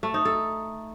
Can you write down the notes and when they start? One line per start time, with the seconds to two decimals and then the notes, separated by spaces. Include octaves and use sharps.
0.03 A3
0.14 D#4
0.25 A4